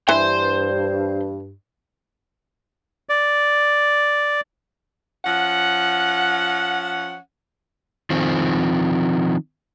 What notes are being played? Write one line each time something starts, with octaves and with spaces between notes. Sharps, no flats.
G2 E3 C5 C6
D5
F3 C#4 F#5
D#3 F3 C4